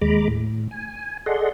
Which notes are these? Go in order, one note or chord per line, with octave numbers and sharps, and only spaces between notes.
D#2 G#3 A#5 B5 D6
A2
G#5
G#4 A4 D5 D#5 F#5 C6